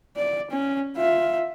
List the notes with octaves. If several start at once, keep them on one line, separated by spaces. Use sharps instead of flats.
D5
C#4
F4 E5